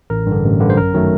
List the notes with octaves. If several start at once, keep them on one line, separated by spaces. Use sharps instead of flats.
A1 A#4
G2 D3
A1
G2 D3
C5
F#2 A#4
D#3 F#3 A3